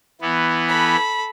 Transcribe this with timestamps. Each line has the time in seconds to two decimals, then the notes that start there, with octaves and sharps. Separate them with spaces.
0.21 E3 B3
0.68 A4 B5